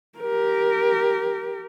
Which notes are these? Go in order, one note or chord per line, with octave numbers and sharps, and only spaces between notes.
G4 A#4